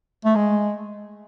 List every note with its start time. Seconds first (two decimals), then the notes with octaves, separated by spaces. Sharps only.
0.25 A3
0.35 G#3